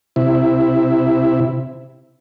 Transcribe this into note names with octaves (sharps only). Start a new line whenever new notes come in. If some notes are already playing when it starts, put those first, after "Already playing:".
C3 E4